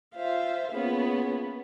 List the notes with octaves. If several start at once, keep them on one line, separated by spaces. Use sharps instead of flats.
F4 C5 E5 F5
A#3 B3 C#4 F4 G#4